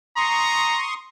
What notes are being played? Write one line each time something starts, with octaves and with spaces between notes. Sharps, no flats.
A#5 C6 C#6 D#6